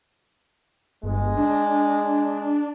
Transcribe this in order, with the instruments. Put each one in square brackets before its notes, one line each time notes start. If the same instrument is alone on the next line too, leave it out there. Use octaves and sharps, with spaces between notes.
[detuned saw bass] G1 [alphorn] G#3
[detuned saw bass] D4